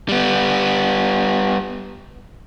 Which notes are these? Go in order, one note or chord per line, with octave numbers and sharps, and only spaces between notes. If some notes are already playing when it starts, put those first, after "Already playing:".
G3 B3